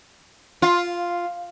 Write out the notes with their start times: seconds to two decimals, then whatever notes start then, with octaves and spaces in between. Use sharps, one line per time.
0.62 F4